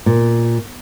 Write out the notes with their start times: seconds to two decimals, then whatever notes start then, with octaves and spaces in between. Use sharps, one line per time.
0.06 A#2